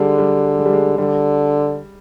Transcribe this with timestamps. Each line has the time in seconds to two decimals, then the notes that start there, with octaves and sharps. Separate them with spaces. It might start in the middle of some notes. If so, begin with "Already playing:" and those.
Already playing: D3 G3 G#3
0.18 G3
0.58 G#3
0.66 G3
0.73 G#3
0.98 D3 G3